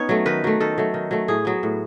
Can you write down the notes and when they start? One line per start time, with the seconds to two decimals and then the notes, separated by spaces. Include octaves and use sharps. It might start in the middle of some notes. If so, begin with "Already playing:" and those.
Already playing: B3 C#4 D#4 C#5
0.09 F#3 A3
0.26 D#3 B4
0.44 F#3 A3
0.61 D#3 A4
0.78 F#3 A3
0.94 D#3
1.11 F#3 A3
1.28 A2 G#4
1.45 F#3 B3
1.63 A2